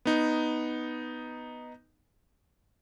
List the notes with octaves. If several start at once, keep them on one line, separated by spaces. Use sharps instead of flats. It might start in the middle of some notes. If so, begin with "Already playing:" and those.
B3 D#4